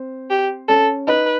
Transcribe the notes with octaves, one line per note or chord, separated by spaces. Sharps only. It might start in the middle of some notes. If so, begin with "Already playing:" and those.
Already playing: C4 C5
G4
C#4 A4 C#5
D#4 B4 D#5